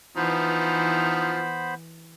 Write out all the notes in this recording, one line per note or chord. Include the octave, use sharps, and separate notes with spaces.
E3 F3 B3 D#4 C5 B5